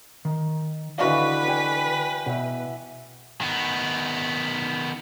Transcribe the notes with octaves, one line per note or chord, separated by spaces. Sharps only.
D#3
D3 E3 F#4 B4 D5 D#5 F5
G5 G#5
B2 E5 F#5
D#3 B3